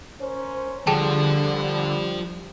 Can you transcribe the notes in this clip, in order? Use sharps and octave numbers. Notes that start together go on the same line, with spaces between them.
C#4 A#4 C5
D3 F3 G3 G#4 G5 A5